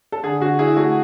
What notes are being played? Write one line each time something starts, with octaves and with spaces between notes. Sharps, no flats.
A4
D3 G#4
D3 F#4
E4 G#4
A3 F#4